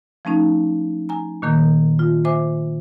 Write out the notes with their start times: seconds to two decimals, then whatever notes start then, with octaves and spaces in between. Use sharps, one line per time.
0.25 F3 A3 C#4 D#4
1.09 G#5 A#5
1.42 A#2 D#3 A#3 G6
1.99 F4
2.25 C5 E5 G#5 D6